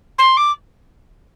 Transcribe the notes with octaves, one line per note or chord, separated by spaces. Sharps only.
C6
D6